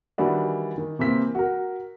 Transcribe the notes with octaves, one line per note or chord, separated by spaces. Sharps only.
D#3 E3 G3 D4 F#4
D#3
C3 E3 A#3 C4 B6
F#4 A#4